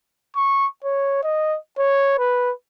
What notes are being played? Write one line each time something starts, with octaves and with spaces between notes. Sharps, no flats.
C#6
C#5
D#5
C#5
B4